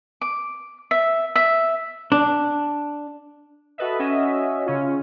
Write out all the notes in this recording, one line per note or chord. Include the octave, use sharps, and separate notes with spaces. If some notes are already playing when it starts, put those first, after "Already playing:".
D6
E5
E5
D4
F#4 A4 B4 D#5 E5
C#4 F#4 D#5 E5
C#3 C#4 F4